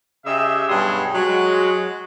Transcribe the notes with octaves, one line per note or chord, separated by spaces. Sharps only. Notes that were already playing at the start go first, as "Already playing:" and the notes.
C#3 G4 D#5 E5
G2 B2 F#3 G3 G#4 C6
F#3 G#3